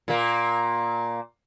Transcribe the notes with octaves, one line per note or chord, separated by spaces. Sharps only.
A#2 A#3